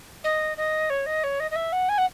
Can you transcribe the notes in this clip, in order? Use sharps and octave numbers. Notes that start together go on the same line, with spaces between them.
D#5
D#5
C#5
D#5
C#5
D#5
D#5
E5
F#5
G#5
F#5